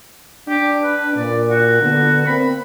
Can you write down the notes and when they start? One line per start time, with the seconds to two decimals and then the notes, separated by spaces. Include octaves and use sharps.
0.48 D4 G4
0.83 B4
1.16 A#2 D5
1.50 F#4
1.82 D3 B3
2.26 A#3 C4 B5